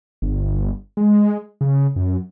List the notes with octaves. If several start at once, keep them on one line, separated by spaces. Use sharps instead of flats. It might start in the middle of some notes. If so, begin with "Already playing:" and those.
G1
G#3
C#3
F#2